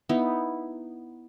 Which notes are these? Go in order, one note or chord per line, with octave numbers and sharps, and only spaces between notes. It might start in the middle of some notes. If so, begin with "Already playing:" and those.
B3 D#4 E4